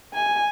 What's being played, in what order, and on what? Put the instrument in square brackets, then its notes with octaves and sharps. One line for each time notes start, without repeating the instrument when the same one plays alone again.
[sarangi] G#5